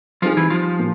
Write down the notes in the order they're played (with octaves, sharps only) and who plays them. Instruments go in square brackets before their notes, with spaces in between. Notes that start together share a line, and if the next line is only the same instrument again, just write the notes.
[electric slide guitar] F3 F4 [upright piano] G3 C4 D#4 G#4
[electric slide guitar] E3 E4
F3 F4
[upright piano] A#2